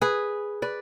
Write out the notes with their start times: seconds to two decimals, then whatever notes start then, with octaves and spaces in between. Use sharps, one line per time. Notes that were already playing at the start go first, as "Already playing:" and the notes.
0.01 G#4 B4
0.62 B4 D5